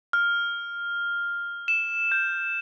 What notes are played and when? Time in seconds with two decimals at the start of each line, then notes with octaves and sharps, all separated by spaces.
0.13 F6
1.68 E7
2.12 G6